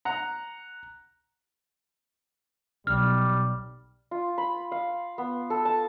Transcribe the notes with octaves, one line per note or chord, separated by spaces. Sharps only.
F#5 A#5
B1 G3 F6
F4
B5
F5
B3
A4
A5